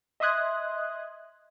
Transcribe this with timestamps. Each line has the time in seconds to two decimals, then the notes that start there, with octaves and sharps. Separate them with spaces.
0.20 D#5 E5 C6 D#6 F#6 G#6